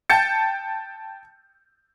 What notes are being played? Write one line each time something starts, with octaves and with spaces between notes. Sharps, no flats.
G5 A5 G6 A6 C#7